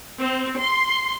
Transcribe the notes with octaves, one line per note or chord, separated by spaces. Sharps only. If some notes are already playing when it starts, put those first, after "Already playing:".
C4
C6